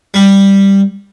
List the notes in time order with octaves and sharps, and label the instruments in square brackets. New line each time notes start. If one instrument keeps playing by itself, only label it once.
[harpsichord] G3